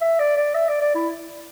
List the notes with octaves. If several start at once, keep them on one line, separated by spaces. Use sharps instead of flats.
E5
D5
D5
E5
D5
D5
E4